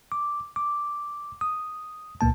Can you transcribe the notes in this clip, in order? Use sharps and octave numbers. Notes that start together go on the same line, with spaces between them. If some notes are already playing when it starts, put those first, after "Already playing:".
D6
D6
D#6
C#2 A#2 A#3 A5